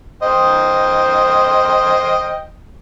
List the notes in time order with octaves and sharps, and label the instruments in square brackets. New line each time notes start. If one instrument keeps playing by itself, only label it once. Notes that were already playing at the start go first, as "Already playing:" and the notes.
[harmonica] C5 D#5 G5